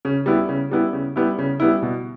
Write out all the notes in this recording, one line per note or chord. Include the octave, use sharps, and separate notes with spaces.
C#3
G3 B3 E4
C#3
G3 B3 E4
C#3
G3 B3 E4
C#3
G3 B3 E4
B2